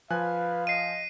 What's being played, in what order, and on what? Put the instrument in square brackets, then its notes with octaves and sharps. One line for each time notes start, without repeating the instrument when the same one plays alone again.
[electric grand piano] F3 G#5 F#6 [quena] B4 [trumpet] F5
[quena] D#5 [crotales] C7 D#7